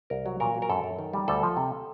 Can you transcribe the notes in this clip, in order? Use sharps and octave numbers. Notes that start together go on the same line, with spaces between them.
C2 A#4
F#3
A#2 A#4
F#3
A#4
F#2 A4
F#2
D#3
G3
D2 A4
F3
C3